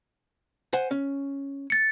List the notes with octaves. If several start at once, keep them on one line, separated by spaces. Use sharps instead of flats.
C5 F#5 G#5
C#4
A6 C#7